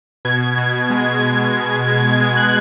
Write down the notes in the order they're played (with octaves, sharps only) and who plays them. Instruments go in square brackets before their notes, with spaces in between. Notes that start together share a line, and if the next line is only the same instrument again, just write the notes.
[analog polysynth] B2 G#6
B2
G#3
G#3
B2
B2
G#3 G#6
G#6
F#6